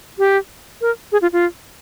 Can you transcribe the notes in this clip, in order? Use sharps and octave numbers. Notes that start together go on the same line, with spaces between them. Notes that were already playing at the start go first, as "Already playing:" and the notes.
G4
A#4
G#4
F4
F4